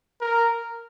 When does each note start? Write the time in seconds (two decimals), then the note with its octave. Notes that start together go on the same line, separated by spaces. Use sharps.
0.21 A#4